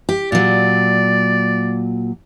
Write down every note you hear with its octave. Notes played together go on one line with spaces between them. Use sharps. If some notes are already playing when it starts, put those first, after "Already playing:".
G4
A#2 F#3 D5